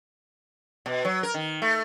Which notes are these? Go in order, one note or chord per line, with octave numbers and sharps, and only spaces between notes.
B2
F#3
A#4
D#3
A3